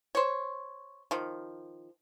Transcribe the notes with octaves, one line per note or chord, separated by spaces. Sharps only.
C5 C#5
D#3 F3